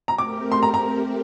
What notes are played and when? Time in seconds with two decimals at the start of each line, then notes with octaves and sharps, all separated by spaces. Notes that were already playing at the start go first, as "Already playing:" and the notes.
0.08 A#5
0.18 A3 C4 G4 A#4 D6
0.52 C6
0.63 A#5
0.74 A#5